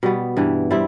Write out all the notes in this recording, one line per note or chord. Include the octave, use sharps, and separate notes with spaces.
B2 G3 B3
G2 E3 G3
G3 C4 E4